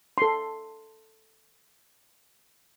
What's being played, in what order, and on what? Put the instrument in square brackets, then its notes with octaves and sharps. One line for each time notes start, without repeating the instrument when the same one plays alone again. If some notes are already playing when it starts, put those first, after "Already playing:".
[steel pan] A4 C6